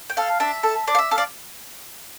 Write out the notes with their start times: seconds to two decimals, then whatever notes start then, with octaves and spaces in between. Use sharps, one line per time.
0.10 G5
0.17 A4 F5
0.40 D4 E5
0.63 A4
0.87 D4 D5
0.95 F5
0.99 E5
1.11 A4 F5
1.18 D5